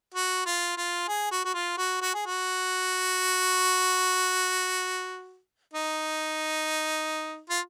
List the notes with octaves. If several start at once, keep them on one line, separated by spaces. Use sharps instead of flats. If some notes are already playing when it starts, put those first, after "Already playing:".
F#4
F4
F4
G#4
F#4
F#4
F4
F#4
F#4
G#4
F#4
D#4
F4